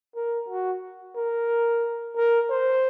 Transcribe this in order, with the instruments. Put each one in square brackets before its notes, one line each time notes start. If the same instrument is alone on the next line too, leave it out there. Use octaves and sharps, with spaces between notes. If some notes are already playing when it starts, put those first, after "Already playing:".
[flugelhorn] A#4
F#4
A#4
A#4
C5